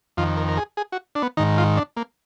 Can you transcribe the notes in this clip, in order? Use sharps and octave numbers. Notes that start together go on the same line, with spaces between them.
F2 D#3 F4
A#4
A#4
G#4
G#4
F#4
D4
B3
G#2 D#3 D#4
F4
D4
A#3